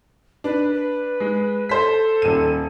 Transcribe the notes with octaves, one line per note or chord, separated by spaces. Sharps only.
D4 B4
B4
G#3
A4 C5 B6
D#1 D#7